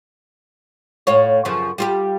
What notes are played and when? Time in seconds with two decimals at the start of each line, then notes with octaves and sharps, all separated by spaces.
1.07 A2 F4 C#5
1.45 F#2 C#3 F3
1.78 G3 F4 G4